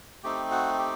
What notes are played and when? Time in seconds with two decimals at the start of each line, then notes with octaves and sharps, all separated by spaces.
0.24 A3 C4 D#4 G4
0.51 F#4
0.78 G4